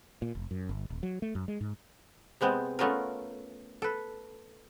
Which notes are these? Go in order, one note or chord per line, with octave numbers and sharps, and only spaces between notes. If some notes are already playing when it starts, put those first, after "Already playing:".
A#2
F1
F#2
G1
D#1
F#3
A3
F#2
G#3
G#2
C3 G#3 B3 C4
A3 B3 C#4 F4 A#4
A4 B4